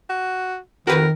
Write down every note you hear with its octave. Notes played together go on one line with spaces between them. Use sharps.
F#4
F2 D#3 F#4 G4 A#4 B4